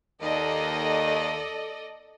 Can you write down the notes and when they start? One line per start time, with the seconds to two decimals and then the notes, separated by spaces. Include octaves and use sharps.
0.22 D#2 D#3 A4 D5 D#5